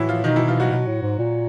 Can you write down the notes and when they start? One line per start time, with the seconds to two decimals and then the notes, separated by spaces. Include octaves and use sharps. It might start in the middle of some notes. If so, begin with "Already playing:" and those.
Already playing: A2 E3 F#3 E4 F#4
0.09 F3 F4
0.24 B2 D#3 D#4
0.36 E3 E4
0.48 F3 F4
0.60 F#3 F#4
0.71 B2
0.87 A2
1.02 G#2
1.19 A#2